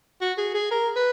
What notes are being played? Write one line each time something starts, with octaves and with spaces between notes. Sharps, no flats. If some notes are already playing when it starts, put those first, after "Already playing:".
F#4
G#4
G#4
A#4
B4